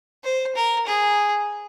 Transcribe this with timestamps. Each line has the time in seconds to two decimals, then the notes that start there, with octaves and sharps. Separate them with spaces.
0.24 C5
0.56 A#4
0.87 G#4